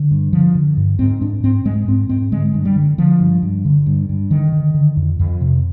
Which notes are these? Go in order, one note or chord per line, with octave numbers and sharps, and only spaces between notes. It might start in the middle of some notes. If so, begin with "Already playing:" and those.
Already playing: D3
G2
D3 F3
D3
G2
G#2 C4
G#2 D4
G#2 C4
G#2 G#3
G#2 C4
G#2 C4
D3 G#3
G2
G3
D3
D3 F3
G2
G2
D3
G2
G2
D3 D#3
D3
D3
F2
F2
C3